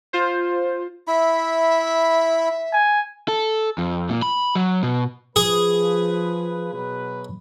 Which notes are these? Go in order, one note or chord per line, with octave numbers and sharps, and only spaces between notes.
F4 C5
E4 E5 B5
G#5
A4
F2
A#2
B5
F#3
B2
F3 G#4 B4
B2 F#3 B4